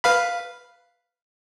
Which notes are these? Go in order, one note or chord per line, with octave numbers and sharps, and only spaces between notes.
B4 F5 B5